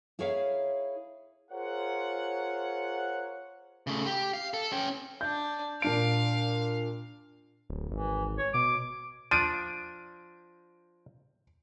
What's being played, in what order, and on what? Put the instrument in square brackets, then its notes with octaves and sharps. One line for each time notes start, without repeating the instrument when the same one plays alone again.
[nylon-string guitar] E4 G#4 A#4 C#5 E5 F5
[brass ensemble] F4 G#4 A#4 C5 C#5 F#5
[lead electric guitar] C#3 A3
G4
F5
A4
C#4 G5
[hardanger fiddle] D4 D5 [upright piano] G6
[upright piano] A#2 D4 D7 [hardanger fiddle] F5
[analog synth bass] D1
[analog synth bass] G#1 [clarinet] E3
[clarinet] C#5
[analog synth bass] B2 [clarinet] D6
[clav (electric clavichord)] F3 D4 [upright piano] D7 D#7